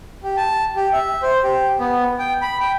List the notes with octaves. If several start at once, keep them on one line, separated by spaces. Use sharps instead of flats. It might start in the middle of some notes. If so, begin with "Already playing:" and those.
G4
A5
G4
E5
C5
G4
B3
G5
B5
G5